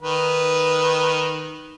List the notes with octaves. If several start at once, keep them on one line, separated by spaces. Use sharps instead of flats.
D#3 B4